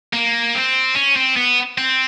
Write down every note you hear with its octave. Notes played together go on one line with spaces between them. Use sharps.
A#3
C4
C#4
C4
B3
C4